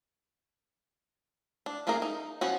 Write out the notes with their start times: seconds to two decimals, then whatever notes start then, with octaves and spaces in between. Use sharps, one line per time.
1.66 D4
1.87 A3 A#3 C#4 G#4 A#4
2.02 D#4
2.41 F3 B3 C#4 F#4